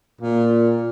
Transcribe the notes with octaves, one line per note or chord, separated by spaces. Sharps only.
A#2